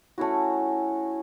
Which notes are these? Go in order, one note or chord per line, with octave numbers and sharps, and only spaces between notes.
A3 C#4 E4 F#4